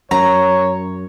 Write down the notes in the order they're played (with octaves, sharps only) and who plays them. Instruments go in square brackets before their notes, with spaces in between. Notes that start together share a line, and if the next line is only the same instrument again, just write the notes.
[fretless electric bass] F#2 [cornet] C#5 [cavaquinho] A#5